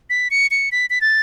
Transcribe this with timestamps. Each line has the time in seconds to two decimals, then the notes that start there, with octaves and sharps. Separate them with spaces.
0.10 B6
0.30 C#7
0.51 C#7
0.72 B6
0.90 B6
1.01 A6